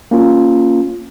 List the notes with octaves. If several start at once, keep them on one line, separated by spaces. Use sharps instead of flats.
A#3 C#4 F4